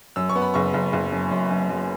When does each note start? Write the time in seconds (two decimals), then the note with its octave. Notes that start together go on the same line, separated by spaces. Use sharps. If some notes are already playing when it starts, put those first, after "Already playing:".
0.16 F#2 E6
0.29 C#6
0.36 B3
0.42 B5
0.54 F#1 C#6
0.74 F#1
0.93 F#1
1.12 F#2
1.31 F#2
1.51 F#2
1.69 F#2